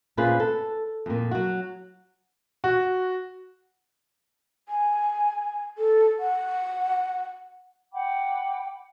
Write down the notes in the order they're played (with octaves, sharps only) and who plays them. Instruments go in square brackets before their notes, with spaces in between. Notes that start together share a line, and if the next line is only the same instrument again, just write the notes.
[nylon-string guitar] A#2 C#4 F4 G#4 B4 C5
A4
F2 A#2
F#3 F#4
[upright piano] F#4
[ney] G#5
A4
F#5
[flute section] F#5 G5 B5 D6